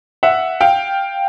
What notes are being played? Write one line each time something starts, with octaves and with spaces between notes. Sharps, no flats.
E5 F#5
F5 G5